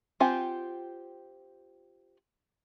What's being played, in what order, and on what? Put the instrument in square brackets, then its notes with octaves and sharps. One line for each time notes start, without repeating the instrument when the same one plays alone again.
[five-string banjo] C4 F4 G4 F#5 G#5